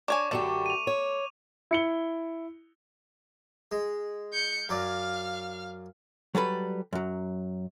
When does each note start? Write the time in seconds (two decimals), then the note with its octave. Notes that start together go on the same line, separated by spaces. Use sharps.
0.08 D4 C#5 G#5 C#6 D6
0.31 F#2 D3 A3 G4 D5
0.66 D#7 F7
0.87 C#5
1.71 E4 C#7 G7
3.71 G#3
4.33 G6 C#7
4.69 F#2 F#3 D5 F5 F6
6.35 F#3 G3 A4 B4
6.93 F#2 F#3